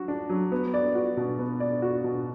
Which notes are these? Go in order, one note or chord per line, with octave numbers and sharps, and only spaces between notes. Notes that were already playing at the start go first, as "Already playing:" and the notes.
Already playing: F#3 F#4
D4
F#3
B3
D5
F#4
B2
B3
D5
F#4
B2